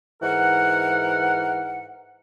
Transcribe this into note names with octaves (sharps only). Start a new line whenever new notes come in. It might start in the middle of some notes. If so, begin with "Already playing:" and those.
G#2 E3 A#4 F#5